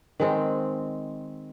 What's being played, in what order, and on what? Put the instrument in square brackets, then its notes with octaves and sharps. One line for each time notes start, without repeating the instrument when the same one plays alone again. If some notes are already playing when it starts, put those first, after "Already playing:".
[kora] D#3 G#3 C4